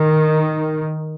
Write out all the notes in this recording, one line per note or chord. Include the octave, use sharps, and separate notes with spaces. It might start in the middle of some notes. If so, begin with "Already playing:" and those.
Already playing: D#3